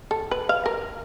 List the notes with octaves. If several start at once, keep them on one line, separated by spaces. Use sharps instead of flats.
A4
B4
F5
A#4